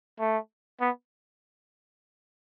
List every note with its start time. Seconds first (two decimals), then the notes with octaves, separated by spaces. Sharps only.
0.19 A3
0.81 B3